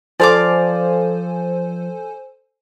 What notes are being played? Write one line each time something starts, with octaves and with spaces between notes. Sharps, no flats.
F3 A4 C5 D5 F5 G#5 D6